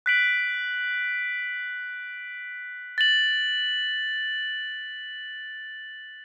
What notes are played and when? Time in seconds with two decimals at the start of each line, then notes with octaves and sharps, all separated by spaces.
0.06 F#6 B6 D7 F#7
2.98 A6 F#7